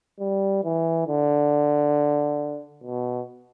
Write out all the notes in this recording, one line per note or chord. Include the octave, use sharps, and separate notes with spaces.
G3
E3
D3
B2